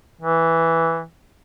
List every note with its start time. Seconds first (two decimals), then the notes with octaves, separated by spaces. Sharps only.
0.21 E3